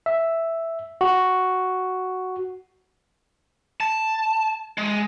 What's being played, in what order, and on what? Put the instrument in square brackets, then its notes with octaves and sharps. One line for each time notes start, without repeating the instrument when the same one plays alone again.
[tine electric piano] E5
F#4
[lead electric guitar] A5
G#3